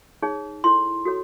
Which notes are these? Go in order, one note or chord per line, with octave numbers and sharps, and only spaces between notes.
D#4 G#4 C#5
E4 A4 C#5 C6
F#4 A4 C#5